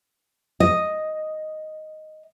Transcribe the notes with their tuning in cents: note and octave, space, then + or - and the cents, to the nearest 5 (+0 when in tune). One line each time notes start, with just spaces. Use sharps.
D#5 +0